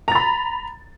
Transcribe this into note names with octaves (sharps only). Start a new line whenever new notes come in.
A#5 B5 A6